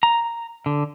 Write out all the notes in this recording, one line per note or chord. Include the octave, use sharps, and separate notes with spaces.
A#5
D3